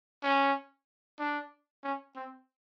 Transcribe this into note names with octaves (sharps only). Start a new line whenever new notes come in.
C#4
D4
C#4
C4